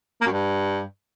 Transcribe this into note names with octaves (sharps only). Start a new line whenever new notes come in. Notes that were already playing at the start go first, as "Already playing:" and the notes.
A#3
F#2
G2